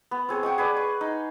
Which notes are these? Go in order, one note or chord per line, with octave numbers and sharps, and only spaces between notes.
B3
C4 G#4 C#5
F#5 G5 C#6 D#6
G#4 B4 D5
C#6
D#4